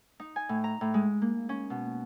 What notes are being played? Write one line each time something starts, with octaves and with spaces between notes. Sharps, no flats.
D#4
G#5
A2
A#5
A2
G#3
A#3
C#4
B2